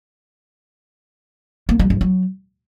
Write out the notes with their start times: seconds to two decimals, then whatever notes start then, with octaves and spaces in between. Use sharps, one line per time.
1.69 A#3
1.79 G3
1.90 G2
2.01 F#3